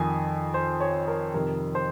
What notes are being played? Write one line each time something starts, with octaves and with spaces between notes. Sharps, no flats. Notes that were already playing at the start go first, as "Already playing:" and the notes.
Already playing: F2 D#3 G#5
C5
C#5
A#4
F2 C3 D#3 A#4
C5